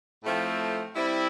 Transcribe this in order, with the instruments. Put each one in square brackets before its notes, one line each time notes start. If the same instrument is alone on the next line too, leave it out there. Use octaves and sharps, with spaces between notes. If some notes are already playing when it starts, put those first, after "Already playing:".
[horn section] A2 F3 A3 C4
G3 C4 E4